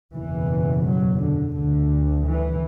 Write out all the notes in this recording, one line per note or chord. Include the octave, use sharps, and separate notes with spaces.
F#1 E2 B2 E3
F#3
D3
D2 D3
E3